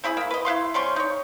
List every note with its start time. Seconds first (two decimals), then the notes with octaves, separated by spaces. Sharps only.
0.04 C4 E4 G#4 B5
0.17 A#3 E4
0.31 B4 D#5
0.45 E4 B4 F5 C6
0.74 C3 G3 C#4 C6
0.96 D#4 C#5